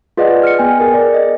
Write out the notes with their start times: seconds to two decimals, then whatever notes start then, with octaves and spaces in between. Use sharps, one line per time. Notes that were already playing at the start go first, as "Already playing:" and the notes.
0.17 F4 G#4 B4 D5 D#5 F#5
0.43 F6 C#7
0.59 B3 G#4 G5 G#5
0.79 G#4 A#4
0.94 D5
1.14 D#5